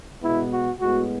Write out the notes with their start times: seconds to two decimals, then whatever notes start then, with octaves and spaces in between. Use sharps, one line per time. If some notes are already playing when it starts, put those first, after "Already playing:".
0.21 B2 G#3 B3 E4
0.51 F#4
0.79 A2 G#3 B3 F#4